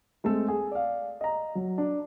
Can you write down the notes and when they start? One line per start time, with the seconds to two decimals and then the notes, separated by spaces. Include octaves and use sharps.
0.24 G#3 A3 C4 A4
0.48 G#4
0.72 D5 F5
1.21 D#5 A#5
1.55 F#3
1.78 D4